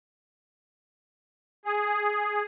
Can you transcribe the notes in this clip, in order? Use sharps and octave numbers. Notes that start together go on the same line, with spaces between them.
G#4